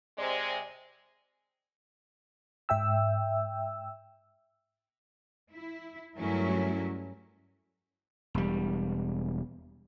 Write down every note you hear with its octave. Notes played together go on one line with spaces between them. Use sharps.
C3 G#3 C5 D5
G#2 E5 G5 E6
E4
G2 F#3 A3 C#4 E4 A#4
E1 G3